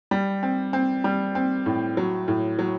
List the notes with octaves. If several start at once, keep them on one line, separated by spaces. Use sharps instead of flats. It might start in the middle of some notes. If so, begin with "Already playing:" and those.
G3
C4
C4
G3
C4
A2
F#3
A2
F#3